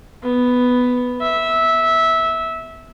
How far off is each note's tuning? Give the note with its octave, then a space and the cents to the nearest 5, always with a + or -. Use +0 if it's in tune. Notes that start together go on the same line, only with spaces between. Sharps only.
B3 +5
E5 -15